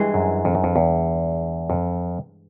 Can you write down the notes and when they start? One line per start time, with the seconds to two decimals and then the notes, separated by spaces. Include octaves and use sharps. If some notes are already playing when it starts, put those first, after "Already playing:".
Already playing: G2 E3 G#3
0.14 F#2
0.45 F2
0.55 F#2
0.64 F2
0.76 E2
1.70 F2